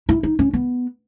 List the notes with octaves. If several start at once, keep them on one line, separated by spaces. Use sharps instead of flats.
E4
D#4
C#4
B3